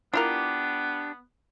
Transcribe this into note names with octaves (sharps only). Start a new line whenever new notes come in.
B3 D4 E4 F4 G4 A#4